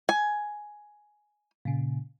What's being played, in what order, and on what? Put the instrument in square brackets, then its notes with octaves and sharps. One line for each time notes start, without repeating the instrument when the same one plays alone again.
[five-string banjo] G#5
[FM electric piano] A#2 C#3